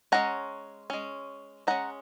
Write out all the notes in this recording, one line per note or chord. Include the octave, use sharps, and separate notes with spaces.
G#3 C#4 F#5 A#5
G#3 C#4
G#3 C#4 F#5 A#5